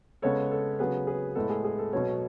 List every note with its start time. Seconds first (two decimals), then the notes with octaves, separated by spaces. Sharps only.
0.22 C#3 G#3 B3 A4 C#5
0.51 A4
0.79 C#3 F#3 B3 G#4 B4
1.07 G#4 B4
1.35 A2 G#3 B3 A4
1.50 G#4
1.64 G#4
1.79 A4
1.93 B2 F#3 B3 A4 C#5